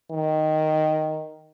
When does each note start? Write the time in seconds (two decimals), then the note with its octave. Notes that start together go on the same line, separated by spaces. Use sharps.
0.12 D#3